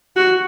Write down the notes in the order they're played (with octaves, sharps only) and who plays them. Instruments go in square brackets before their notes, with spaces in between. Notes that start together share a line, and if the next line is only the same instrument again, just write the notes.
[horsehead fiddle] F#4